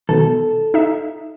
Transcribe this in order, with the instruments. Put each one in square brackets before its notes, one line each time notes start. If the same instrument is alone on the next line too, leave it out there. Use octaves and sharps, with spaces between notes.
[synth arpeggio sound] B2 D#3 [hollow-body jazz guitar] A4
[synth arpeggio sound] D#4 E5